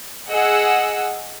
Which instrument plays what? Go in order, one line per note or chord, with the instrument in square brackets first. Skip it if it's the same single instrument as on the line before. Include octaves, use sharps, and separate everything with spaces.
[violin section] G#4 D#5 F#5 E6